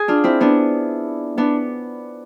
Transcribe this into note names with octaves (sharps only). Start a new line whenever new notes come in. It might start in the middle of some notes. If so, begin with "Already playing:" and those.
Already playing: G#4
D4 F4
C4 E4
B3 D4
B3 D4